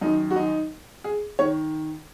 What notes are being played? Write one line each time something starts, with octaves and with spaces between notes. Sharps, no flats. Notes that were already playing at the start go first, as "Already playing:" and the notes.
F#2 D#3 D#4
F#4
D#4
G#4
D#3 C#5